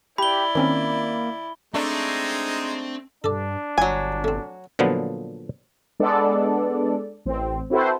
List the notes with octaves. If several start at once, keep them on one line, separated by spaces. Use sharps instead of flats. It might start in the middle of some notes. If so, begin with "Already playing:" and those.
E4 G4 D5 B5 G7
D#3 A#3 C4 C#4
G#3 A3 C4 D4 D#4
G2 D4 A4 D5
G1 F#3 G#5
A3 C4
A#2 D3 F3 F#3 B3
G#3 B3 D4 A4 D5
A1 C4
C4 E4 F#4 A4 B4 C5